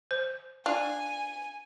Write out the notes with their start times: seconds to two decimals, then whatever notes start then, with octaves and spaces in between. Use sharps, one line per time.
0.11 C5
0.66 D4 F4 G#5